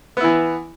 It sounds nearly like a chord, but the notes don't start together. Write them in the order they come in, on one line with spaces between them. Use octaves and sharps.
B3 E4 E3